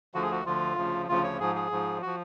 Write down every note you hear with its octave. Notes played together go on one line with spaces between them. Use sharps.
D2 D3 F3 F#4
G#4
F#4
D2 D3 F3 F4
D2 C#3 F3
D2 C#3 F3 F4
C#5
G#2 F3 G#4
G#4
G#2 F3
F3 F#4